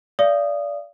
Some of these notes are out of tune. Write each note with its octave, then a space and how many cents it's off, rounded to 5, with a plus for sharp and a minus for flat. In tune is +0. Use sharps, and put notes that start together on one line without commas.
D5 -20 F5 -35 D#6 -10